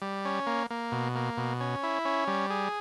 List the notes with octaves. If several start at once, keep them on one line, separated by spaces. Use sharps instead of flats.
G3
C#4
A#3
A#3
B2
A#3
B2
C#4
E4
C#4
G3
G#4